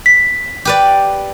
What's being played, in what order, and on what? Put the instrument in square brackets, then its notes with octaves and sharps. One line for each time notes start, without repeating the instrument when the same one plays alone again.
[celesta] B6
[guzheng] G4 B4 D5